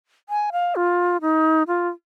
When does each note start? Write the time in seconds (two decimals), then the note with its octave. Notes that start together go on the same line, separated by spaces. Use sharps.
0.29 G#5
0.52 F5
0.76 F4
1.21 D#4
1.68 F4